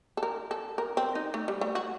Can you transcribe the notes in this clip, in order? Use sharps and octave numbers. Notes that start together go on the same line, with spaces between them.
A4
A#4
A4
A#4
C4
D#4
A3
G3
A3
F#4